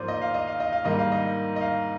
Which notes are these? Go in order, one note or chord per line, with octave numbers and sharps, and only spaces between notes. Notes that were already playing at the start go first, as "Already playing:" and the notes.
Already playing: G#2 F3 A#3 C5 D5
D#5
F5
D#5
F5
D#5
F5
G#2 D#3 G3 A#3 D#5
F5
D#5
D#5
F5